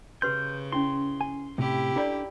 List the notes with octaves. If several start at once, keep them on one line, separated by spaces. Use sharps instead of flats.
C#3 G4 B4 C6 G6
C#4 E4 C6
G#5
A2 C3 E4 G4
D4 A4 C#5 D5 A#5 B5